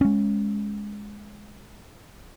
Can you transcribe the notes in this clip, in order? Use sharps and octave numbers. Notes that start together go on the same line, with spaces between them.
G#3 C#4